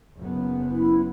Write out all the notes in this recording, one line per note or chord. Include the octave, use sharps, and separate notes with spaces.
F#1 B3
E4